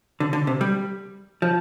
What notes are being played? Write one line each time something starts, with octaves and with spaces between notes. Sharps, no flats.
D3
D3
C3
G3
F3